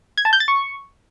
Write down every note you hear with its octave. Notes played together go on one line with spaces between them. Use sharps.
G#6
A5
G6
A6
C#6